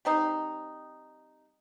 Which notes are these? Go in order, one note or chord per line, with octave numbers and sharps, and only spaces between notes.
G3 C4 D#4